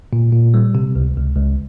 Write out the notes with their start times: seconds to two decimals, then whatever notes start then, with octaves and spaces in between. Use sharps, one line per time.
0.13 A#2
0.33 A#2
0.54 G3
0.75 C3
0.95 C#2
1.17 C#2
1.37 C#2